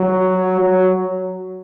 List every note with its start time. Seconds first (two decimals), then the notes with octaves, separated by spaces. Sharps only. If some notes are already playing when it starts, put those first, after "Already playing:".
Already playing: F#3
0.60 F#3